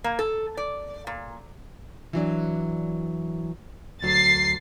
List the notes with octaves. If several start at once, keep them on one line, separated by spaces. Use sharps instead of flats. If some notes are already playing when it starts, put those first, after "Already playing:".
A#3
A4
D5
A#2
E3 F#3 D4
D2 F#3 A6 C7